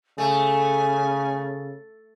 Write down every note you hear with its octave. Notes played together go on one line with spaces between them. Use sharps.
C#3 A3 G#5